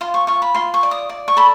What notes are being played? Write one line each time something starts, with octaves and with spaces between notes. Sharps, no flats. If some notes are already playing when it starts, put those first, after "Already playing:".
F4 C6
C#6
F4 C#6
B5
F4 C6
C#6
D5
D#6
D5
C#6
A4 B5